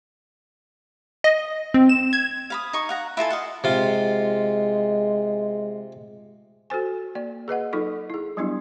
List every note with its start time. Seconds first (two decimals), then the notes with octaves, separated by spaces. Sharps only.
1.24 D#5
1.74 C4
1.89 E7
2.13 G#6
2.50 F5 B5 D#6
2.73 D#4 C#6 D#6
2.89 F5 F#5 A#5
3.17 E4 F4 A4 G#5
3.30 D#5 F5 F#5
3.64 C3 G#3 F4
6.70 F#4 A4 C5 G#5
7.15 A#3 D5
7.48 G#4 B4 D#5 F#5
7.73 F#3 D#4 F4 A4 C#6
8.10 E4 G#4
8.37 F#3 G3 B3 D4 E4 G4